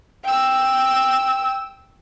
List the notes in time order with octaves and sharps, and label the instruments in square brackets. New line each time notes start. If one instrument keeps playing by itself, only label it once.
[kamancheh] G5 E6